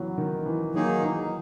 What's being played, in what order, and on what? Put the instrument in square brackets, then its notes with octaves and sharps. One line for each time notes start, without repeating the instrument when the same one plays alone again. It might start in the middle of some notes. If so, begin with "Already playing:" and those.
Already playing: [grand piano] E3 F#3 B3 C#4
D#3
E3
[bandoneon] D#3 A#3 D#4 G#4 [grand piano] F#3
[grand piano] E3